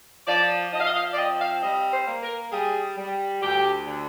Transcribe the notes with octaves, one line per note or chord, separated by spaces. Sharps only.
F3 D5
F3 D#5
F5
D#5
F5
D5
C4 D#5
F5
G3 D#5
C5
A#3
A#4
G3 G#4
G3
D2 G4
D3